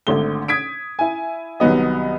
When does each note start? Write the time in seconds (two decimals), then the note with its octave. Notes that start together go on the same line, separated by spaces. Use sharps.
0.07 G#1 D3 A3 G7
0.48 D#6 G#6 B6 D7
0.99 E4 G#5
1.60 C2 D#3 F#3 B3 D#5